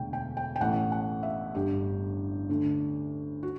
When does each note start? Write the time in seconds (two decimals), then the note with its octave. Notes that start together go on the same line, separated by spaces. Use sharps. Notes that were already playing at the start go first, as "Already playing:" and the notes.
Already playing: E1 D2 D3 G5
0.13 G5
0.37 G5
0.56 G5
0.61 A1 A2 E3 F#5
0.92 F#5
1.23 E5
1.55 G1 G2 D3 G4
2.49 D2 D3
3.43 F#4